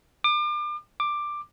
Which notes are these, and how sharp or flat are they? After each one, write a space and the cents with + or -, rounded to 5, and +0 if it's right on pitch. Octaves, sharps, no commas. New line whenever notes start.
D6 +35
D6 +10